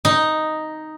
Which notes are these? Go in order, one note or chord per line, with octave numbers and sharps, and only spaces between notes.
D#4